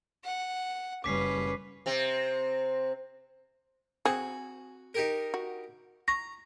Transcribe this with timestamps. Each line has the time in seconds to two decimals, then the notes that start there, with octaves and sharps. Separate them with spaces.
0.24 F#5
1.04 F#1 G3 C#4 B4 D6 B6 C7
1.86 C3 C4
4.05 C4 F#4 G#4
4.95 D#4 G4 A#4
5.34 F#4
6.08 A#5 C#6 A#6